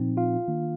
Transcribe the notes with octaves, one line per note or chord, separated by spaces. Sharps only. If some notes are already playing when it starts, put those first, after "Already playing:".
Already playing: A#2 F3 C4 D#4
F4 F5
D#3 A#3 D4